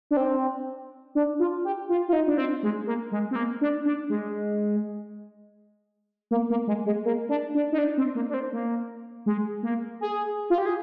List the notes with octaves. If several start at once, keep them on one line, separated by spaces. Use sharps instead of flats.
D4
C4
D4
F4
G4
F4
F4
D#4
D4
C4
G#3
A#3
G#3
C4
A#3
D4
D4
G#3
A#3
A#3
G#3
G#3
A#3
D4
D4
D#4
D4
C4
A#3
D4
C4
A#3
G#3
A#3
G#4
F4
G4
G#4